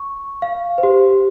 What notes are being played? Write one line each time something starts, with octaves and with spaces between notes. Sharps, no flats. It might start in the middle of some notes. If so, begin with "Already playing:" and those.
Already playing: C#6
F5
C5
G4